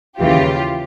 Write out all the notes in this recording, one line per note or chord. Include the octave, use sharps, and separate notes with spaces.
D#2 C#3 E3 F4 G4